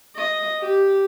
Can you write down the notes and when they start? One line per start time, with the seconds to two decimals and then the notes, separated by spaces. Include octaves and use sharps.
0.16 D#5
0.61 G4